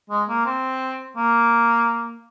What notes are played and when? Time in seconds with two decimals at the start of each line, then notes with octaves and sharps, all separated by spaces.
0.10 G#3
0.29 A#3
0.45 C4
1.17 A#3